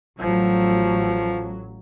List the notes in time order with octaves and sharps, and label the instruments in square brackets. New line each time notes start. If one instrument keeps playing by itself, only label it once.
[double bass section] A1 F#3 [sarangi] F3